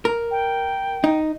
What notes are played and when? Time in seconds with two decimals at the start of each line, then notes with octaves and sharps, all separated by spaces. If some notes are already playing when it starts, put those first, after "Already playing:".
0.05 A#4
0.31 G5
1.04 D#4